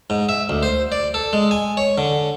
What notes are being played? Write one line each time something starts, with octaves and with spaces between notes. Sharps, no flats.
G#2
E5
D2
C5
D5
A4
G#3
G#5
C#5
D3